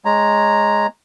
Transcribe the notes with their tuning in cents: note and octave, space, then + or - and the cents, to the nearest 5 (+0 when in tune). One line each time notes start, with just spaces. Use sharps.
G#3 +0 C#5 +0 A#5 +0